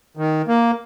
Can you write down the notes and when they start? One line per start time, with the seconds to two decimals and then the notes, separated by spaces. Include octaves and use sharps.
0.17 D#3
0.48 A#3